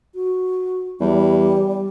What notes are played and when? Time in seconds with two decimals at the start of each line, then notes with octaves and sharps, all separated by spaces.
0.15 F#4
1.00 E2 G3